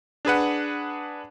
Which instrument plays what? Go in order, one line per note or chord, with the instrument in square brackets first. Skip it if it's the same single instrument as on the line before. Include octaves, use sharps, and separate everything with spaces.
[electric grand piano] D4 G#4 B4 F#5